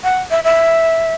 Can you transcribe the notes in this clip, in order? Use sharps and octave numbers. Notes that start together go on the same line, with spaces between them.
F#5
E5
E5